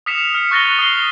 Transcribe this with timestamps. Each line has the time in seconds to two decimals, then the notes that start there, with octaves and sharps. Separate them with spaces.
0.06 D#6 F6 B6 C#7 E7 F7
0.35 F6 C#7
0.51 C#6 F#6 A6 A#6 C#7 G7
0.79 D#6 F6 C7 G7